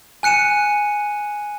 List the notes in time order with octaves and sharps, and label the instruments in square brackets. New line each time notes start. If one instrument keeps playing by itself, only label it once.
[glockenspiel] G#5 F#6 C#7 D#7 E7